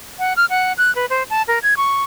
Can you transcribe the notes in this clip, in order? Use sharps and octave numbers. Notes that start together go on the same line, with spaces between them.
F#5
F6
F#5
F#6
B4
C5
A5
A#4
G#6
C#6